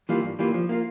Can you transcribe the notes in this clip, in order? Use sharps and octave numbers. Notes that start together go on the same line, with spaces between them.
E3 G3 A#3 F4
G2
E3 G3 A#3 F4
F3
A#3 F4